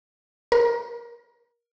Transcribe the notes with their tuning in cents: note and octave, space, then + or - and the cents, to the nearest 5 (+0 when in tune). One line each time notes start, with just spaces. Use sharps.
A#4 +20